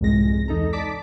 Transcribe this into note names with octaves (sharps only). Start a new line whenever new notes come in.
C2 F2 G#2 C3 G#3 A#6
E2 D#4 A4 A#5
D5 A5 D6 B6